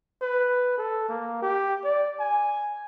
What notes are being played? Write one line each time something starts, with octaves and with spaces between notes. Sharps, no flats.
B4
A4
A#3
G4
D5
G#5